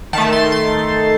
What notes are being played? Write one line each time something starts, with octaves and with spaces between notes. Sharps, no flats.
D#3 A3 A5
C6
C6